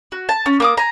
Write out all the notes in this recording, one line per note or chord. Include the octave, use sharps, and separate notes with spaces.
F#4
A5
C#4
A#3 D6 D#6
G#5 A#5